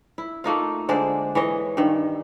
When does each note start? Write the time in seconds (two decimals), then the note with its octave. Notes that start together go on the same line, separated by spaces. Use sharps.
0.18 E4
0.44 A3 A#3 D#4 F4
0.89 D3 G#3 C5 D5
1.35 E3 C#5 D#5
1.77 G2 D#3